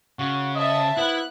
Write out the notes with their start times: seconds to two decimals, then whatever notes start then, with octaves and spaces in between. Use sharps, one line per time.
0.19 C#3 F#4
0.55 C5 D#5 E5 A5
0.97 B3 E4 F#6